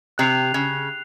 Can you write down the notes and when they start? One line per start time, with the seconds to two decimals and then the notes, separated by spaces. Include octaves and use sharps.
0.18 C3 F#6 C7 F7
0.54 C#3